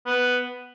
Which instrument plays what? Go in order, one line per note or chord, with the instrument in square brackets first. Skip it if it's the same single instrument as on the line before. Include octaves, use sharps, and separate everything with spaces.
[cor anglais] B3